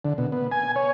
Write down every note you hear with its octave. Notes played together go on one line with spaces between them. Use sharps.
D3
B2
B3
G#5
C#5